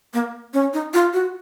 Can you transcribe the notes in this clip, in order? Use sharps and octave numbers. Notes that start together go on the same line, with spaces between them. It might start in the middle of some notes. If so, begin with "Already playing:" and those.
A#3
C#4
D#4
F4
F#4